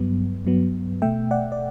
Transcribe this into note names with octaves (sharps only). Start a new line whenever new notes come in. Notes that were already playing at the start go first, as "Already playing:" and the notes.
Already playing: G2 F#3 B3
G2 F#3 B3
B2 A3 E5 G5
D5 F#5
D5